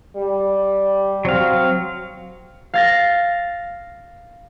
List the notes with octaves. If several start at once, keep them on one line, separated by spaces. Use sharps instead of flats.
G3
F#3 C4 F5
F5 A6 A#6